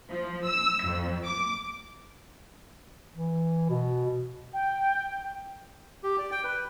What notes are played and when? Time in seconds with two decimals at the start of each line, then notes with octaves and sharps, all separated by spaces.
0.11 F3
0.47 E6
0.85 F2
1.26 D6
3.15 E3
3.69 B2
4.54 G5
6.03 G4
6.18 D5
6.31 G5
6.44 B4